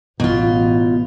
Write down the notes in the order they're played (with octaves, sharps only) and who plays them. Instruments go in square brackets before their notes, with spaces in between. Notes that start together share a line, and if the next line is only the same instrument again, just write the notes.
[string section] A1 [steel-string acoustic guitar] B2 F4